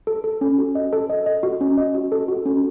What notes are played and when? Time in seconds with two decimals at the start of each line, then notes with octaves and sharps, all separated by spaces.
0.07 A4
0.24 A4
0.41 C#4
0.58 F#4
0.75 D#5
0.93 A4
1.10 D#5
1.26 D#5
1.43 F#4
1.61 C#4
1.78 D#5
1.95 F#4
2.12 A4
2.28 F#4
2.46 C#4